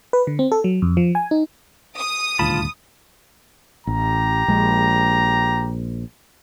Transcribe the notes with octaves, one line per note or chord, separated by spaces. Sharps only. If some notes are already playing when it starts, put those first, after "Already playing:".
B4
D3
C4
A4
F#3
F2
F3
G#5
D#4
D#6
D#1 D2 G#2 F4 A5 B5
A1 G4 A#5
A#1 G#3